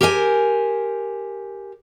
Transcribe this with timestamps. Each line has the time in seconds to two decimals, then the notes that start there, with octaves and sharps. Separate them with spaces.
0.01 G4 A#4 C5 E5 G#5